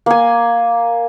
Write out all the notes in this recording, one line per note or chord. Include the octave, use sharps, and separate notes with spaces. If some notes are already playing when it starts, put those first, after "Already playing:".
A#3 G#5